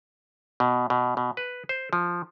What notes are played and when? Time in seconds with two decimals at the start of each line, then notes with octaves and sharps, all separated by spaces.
0.60 B2
0.90 B2
1.17 B2
1.37 B4
1.69 C5
1.93 F3